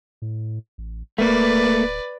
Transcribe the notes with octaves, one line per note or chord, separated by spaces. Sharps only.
A2
A1
D1 A3 A#3 B4 D5